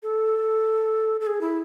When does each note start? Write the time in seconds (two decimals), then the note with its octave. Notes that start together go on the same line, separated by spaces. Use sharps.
0.03 A4
1.21 A4
1.27 G#4
1.41 E4